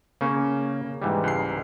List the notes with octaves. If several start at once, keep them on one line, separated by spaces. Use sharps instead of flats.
C#3 A#3 C#4
G#2 E3 G3
C#2 C7